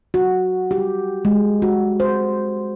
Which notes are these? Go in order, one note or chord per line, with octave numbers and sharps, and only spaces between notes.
F#4
G4
G#3
F#4
C5